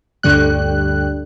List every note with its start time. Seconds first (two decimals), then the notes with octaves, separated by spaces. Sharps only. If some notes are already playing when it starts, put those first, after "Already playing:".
0.23 D2 G2 D3 G3 F#6